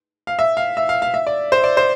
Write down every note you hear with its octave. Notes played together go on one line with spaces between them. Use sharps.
F5
E5
F5
E5
F5
F5
E5
D5
C5
D5
C5